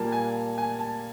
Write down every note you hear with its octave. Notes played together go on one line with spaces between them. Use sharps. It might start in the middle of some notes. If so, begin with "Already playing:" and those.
Already playing: A#2 G3 A#3 A5
G#5
G#5
A5